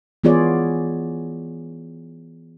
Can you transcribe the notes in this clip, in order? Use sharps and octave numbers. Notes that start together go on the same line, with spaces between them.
E3 B3 F4 G#4 C#5 D5